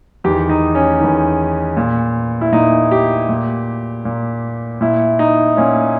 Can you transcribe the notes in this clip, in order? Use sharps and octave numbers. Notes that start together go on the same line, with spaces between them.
E2 D#3 G4
D#4
C#4
E2 D#3
A#2
E4
A#2 D#4
G4
A#2
A#2
A#2 E4
D#4
A#2 C#4